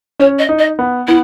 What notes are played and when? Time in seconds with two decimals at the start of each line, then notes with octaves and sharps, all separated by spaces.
0.19 C#4 C#5
0.39 D#5
0.49 D#4
0.59 D#5
0.79 B3
1.08 B3 E4